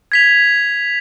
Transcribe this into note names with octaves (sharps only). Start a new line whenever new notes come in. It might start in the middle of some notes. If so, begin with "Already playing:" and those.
G#6 B6 F7